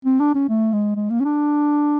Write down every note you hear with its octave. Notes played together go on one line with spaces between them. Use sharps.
C4
D4
C#4
A3
G#3
G#3
A#3
C#4
D4